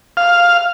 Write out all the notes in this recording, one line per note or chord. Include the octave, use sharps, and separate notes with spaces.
F5